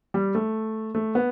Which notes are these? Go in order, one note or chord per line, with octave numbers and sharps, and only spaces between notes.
G3
A3
A3
B3